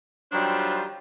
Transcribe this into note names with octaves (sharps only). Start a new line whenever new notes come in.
D#3 F#3 G3 D4 F4 C5